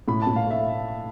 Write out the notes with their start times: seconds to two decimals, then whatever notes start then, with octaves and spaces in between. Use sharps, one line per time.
0.08 A2 B5
0.22 A5
0.27 A2
0.36 F5
0.46 A3 E5